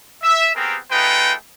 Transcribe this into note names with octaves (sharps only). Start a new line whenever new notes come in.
E5
B3 C4 G4 G#4 A#4
A3 D#4 F4 G#4 B4 G5